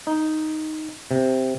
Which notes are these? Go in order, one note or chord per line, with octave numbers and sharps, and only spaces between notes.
D#4
C3